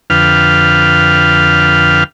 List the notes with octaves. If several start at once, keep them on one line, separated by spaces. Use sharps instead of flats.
F2 D3 B4 F5 G5 F6